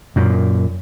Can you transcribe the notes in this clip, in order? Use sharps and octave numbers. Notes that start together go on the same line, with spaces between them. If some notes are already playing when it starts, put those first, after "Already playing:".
F#2 A#2